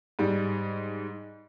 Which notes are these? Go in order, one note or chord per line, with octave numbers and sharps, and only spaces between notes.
G#2 G3